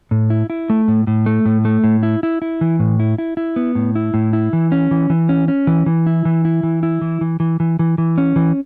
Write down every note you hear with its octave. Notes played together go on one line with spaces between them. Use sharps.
A2
E4
E4
A3
A2
A2
A3
A2
A3
A2
E4
E4
E4
E3
A2
E4
E4
E4
B3
A2
E4
A2
E4
E3
C#4
E3
E3
C#4
C#4
E3
E3
E4
E3
E4
E3
E4
E3
E3
E3
E3
E3
E3
C#4
E3